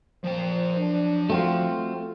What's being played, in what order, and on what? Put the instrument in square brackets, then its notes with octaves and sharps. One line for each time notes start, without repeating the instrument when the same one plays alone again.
[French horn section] A#2 C5 [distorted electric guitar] F3 G5
[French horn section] F#3 D4
[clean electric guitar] A3 C4 F4 [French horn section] F#4